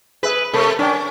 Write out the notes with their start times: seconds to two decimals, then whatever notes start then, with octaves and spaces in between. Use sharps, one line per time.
0.23 G#4 B4 E5
0.54 C3 A3 A4 A#4
0.79 C#4 D4 D5 G5